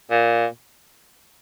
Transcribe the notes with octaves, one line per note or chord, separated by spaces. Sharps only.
A#2